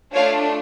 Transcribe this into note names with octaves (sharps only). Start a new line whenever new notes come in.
A3 D4 F4 C#5 F5